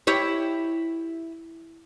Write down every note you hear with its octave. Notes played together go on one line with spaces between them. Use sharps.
E4 G4 C#5